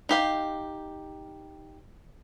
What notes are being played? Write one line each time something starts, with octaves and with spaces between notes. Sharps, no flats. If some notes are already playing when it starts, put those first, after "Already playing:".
D#4 G4 F5